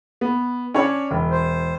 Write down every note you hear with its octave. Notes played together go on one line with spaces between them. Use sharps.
B3
C#4 D4 C#5
E1
C5